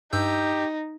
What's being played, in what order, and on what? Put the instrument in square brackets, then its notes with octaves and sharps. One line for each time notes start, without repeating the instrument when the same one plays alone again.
[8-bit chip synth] G2 E6 G6 [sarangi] D#4 [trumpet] G4